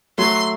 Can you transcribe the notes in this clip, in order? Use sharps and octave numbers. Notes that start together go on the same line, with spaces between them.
F#3 A3 C6